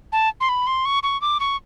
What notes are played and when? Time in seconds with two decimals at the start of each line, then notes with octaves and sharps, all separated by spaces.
0.12 A5
0.40 C6
0.49 B5
0.67 C6
0.85 C#6
1.03 C#6
1.21 D6
1.40 C#6